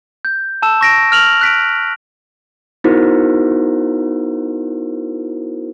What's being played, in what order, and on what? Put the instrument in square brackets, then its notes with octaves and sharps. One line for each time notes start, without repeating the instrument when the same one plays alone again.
[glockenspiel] G6
A5 E6 E7
C#6 A#6 D7
F6 F7 F#7
F#6 B6 D7
[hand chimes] B3 D#4 E4 F#4 A#4 C5